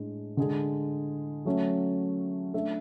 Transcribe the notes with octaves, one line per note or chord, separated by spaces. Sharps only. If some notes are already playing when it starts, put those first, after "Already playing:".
Already playing: A2 G#3 D4
D3 G#3 D4 G#4
F#3 A3 C#4
A3 D4 A4 E5